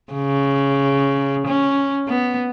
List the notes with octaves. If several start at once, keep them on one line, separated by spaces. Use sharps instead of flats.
C#3
C#4
B3